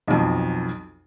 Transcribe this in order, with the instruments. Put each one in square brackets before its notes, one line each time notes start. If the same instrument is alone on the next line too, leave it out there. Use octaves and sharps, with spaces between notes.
[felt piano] B1 F2